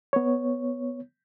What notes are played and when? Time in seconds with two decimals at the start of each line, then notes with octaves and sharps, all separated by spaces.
0.13 B3 C#5